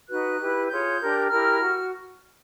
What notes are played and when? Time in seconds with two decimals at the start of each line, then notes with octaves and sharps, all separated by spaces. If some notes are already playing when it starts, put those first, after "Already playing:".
0.09 D#4 F#4 B4 F#6
0.39 E4 G4 B4
0.69 F4 G#4 C#5 G6
1.00 D4 G4 A#4
1.29 E4 G4 A#4 F6
1.60 F#4